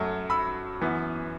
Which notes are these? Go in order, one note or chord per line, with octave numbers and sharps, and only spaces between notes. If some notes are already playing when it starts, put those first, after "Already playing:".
Already playing: F#2 F#3 A3
B5 E6
F#2 E3 B3